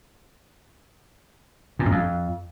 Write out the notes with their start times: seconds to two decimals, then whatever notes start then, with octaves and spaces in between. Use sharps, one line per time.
1.79 A#2
1.85 F#2
1.92 F2